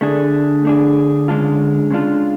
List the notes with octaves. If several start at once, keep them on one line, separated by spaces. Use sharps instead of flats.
D3 A3 D4 G#4
A3 D4 G#4
C#3 G#3 D4 F4 A4
C#3 G#3 D4 F4 A4